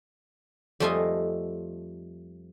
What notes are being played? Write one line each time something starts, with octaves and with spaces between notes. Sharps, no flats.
F2 G3 A3 F4 D#5 G#5